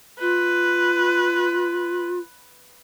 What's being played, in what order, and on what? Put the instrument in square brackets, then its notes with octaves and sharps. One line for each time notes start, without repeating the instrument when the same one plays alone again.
[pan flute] F4 [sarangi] B4